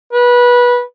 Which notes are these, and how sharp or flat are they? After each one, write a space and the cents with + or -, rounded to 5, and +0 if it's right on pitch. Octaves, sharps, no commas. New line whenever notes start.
B4 -20